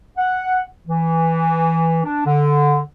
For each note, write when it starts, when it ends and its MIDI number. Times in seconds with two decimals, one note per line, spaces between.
0.17 0.61 78
0.87 2.03 52
2.04 2.23 62
2.26 2.78 50